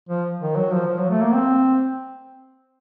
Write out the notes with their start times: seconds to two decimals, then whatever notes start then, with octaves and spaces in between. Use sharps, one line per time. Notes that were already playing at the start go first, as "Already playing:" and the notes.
0.09 F3
0.40 D#3
0.56 F#3
0.72 F3
0.87 F3
0.99 F#3
1.10 A3
1.22 A#3
1.34 C4